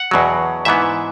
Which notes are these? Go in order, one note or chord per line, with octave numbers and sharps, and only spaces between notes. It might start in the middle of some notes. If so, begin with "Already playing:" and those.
Already playing: F#5
E2 B2 F#3
G#2 E3 B3 E5